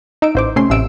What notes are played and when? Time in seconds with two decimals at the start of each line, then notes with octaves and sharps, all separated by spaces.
0.22 D#4 E6 D7
0.35 A1 C5 D6
0.56 C3 A3 C#4 C6
0.70 A1 C3 E6 D7